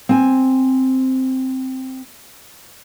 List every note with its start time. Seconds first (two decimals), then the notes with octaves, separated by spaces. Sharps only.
0.09 C4 G#5